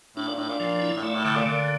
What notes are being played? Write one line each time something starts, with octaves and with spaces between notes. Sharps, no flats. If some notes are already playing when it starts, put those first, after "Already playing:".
A2 D4
A#2
A2 D4
A#2
A#2 F3
E4
A2
A#2 A3
A2
A2 D3
A#2
A#2 D3